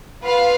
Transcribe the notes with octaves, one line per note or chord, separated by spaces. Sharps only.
B3 F4 B4 F5